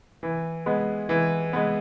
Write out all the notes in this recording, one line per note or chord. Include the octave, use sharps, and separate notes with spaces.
E3
G#3 B3
E3
G#3 B3